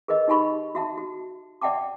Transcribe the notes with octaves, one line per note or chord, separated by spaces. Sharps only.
G#4 A#4 B4 D#5
D#4 G4 G#5 B5 C#6
F#4 E5 A5
F#4
D5 E5 F#5 G5 A5 D6